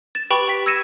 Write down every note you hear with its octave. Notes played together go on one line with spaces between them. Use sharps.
A6 E7
G4 B4 G5 B5 C#6 F7
G5 B6
E6 G#6 A#6 C#7 D#7 E7